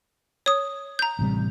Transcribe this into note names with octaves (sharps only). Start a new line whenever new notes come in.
C#5 D#6
A#5 G6
A1 C3 G3